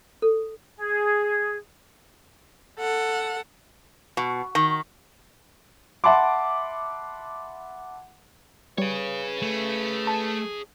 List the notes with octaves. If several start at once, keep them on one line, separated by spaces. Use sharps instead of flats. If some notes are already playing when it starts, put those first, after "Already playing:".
A4
G#4
A4 F#5
B2
D#3
E5 F#5 A5 B5 C6 D6
G3 G#4 B4 C#5
A3
A5